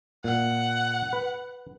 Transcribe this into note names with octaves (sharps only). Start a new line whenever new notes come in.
A#2 F#5
B4